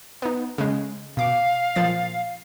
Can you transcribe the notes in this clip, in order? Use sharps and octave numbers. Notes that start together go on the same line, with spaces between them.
B3 D#4
C#3 G#3
B2 F5 D6
A#2 F3 A6